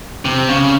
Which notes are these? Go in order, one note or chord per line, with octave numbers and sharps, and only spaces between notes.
C3
C#3